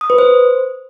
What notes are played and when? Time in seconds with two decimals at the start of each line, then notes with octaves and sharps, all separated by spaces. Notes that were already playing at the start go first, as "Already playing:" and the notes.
0.01 D#6
0.10 B4
0.18 C5